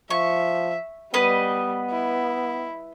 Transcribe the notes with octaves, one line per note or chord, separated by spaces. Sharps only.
F3 E5 C#6
G3 B3 B4 D#5
E4